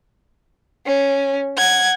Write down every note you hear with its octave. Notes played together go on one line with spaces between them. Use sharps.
C#4
F#5 G#6